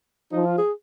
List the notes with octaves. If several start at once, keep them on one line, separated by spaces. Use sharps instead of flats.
F3 D#4
F4
G#4